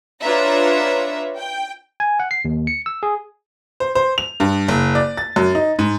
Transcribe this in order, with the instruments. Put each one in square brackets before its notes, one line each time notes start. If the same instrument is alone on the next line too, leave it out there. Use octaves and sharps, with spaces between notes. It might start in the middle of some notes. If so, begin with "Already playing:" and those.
[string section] D4 F4 B4 C#5 E5 A#5
G5
[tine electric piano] G#5
F#5
C7
D#2
C#7
E6
G#4
[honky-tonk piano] C5
C5
F7
G2
F#1
D5
A6
F#2
D#4
G#2